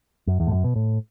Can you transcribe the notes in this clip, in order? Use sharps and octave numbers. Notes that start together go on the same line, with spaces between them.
F#2
E2
A2
F#2
B2
A2